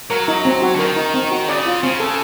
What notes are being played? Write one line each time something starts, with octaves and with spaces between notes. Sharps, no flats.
F#3 A#4
D#4
C4
F#4
D3
D#3 A#4
D#4
C4
F#4
C#3 D5
F4
C#3 C4
A4